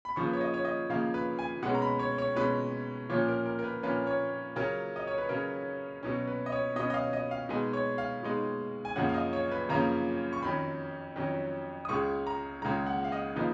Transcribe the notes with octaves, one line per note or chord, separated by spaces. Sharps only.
B5
C#3 F3 A#3 C#6
B4
C#5
D#5
C#5
D#5
C#3 F3 A#3 F5
B4
G#5
B2 G#3 C#4 F#5
A#5
B5
C#5
C#5
B2 G#3 C#4 B4
A#2 F3 A#3 C#4 C#5
A#4
A#4
A#4
B4
A#2 F3 A#3 C#4 B4
C#5
C#3 F#3 C#4 A#4
D#5
C#5
B4
C#3 F#3 C#4 A#4
B2 F#3 C#4
B4
D#5
C#5
B2 F#3 C#4 D#5
D#5
F5
D#5
F5
B2 G#3 D#4 G#5
C#5
F5
B2 G#3 D#4
G#5
F#2 C#3 F3 A#3 C#4 F#5
F5
D#5
C#5
B4
F#2 C#3 F3 A#3 C#4 A#5
C#6
F2 D#3 F#3 C#4 B5
F2 D#3 F#3 C#4
D#6
C#2 C#3 G#3 C#6
A#5
C#2 C#3 G#3 A#5
F#5
F5
D#5
C#3 F3 A#3 D#4 B4